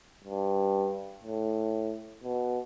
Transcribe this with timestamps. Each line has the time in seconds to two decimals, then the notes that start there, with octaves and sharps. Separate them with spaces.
0.24 G2
1.24 A2
2.24 B2